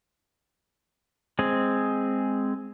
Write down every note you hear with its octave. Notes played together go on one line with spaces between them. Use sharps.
G#3 C4 G#4